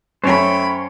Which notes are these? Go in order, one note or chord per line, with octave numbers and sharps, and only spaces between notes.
F#2 A3 C#4 C5 C#5 G5 B5